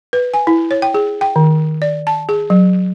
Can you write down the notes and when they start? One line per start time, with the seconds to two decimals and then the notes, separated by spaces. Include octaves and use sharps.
0.13 B4
0.34 G#5
0.47 E4
0.71 C#5
0.82 G5
0.94 G#4
1.21 G5
1.36 D#3
1.82 D5
2.07 A5
2.29 G#4
2.50 F#3